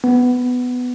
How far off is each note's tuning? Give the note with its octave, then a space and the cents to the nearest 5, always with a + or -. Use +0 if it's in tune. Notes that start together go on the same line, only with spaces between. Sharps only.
B3 +10